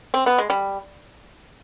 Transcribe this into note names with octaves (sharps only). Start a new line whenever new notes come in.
C4
B3
G#3
G3